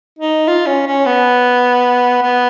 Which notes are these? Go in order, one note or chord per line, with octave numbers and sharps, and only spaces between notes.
D#4
F4
C#4
C#4
B3
B3